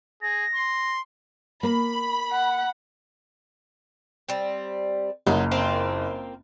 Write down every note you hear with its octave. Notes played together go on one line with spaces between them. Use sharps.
G#4 A#6
C6
A#3 B5
F#5
G3 C4
F#1 F#3 D#4 F4
A#3 C4 F4